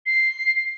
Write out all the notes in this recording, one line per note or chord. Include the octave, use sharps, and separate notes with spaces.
C7